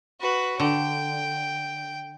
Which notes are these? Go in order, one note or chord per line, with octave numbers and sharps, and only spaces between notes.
F#4 B4
D3 G5